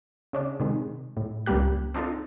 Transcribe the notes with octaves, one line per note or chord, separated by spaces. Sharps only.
C#3 C#4 D4
C3 D#3 G#3
A2
C#2 G2 G3 A#3 G4 F#6
C4 D4 D#4 F4 A4